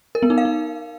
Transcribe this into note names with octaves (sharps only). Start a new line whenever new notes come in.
A#4
B3
D#4
F5
D#4